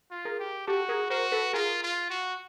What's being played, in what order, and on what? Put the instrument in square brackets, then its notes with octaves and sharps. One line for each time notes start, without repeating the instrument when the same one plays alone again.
[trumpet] F4
[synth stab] G#4 A#4
[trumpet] G4
[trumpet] F#4 [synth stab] G4 A4
[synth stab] G#4 A#4
[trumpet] F#4 [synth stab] A#4 C5
[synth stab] A4 B4
[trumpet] F4 [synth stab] G#4 A#4
[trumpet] F4
F#4